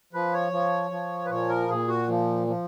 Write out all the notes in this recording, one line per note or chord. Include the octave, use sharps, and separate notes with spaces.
F3 B4
C#5
F3
F3
B4
A#2 C#5
A#4
A#2 G#4
F#4
F3
F3